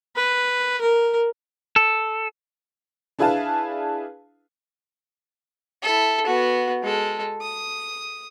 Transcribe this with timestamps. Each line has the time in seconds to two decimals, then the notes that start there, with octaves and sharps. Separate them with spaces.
0.16 B4
0.81 A#4
1.76 A4
3.19 D4 E4 G#4 B4 F5 A5
5.82 E4 A4
6.26 B3 F#4
6.83 G#3 A4
7.42 D#6